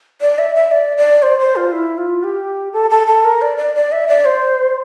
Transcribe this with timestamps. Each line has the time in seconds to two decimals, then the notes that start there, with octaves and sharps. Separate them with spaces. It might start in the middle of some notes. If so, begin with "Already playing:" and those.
0.21 D5
0.38 E5
0.55 E5
0.71 D5
0.97 D5
1.22 C5
1.39 C5
1.56 F4
1.72 E4
1.98 F4
2.23 G4
2.73 A4
2.90 A4
3.07 A4
3.24 A#4
3.42 D5
3.57 D5
3.75 D5
3.92 E5
4.08 D5
4.25 C5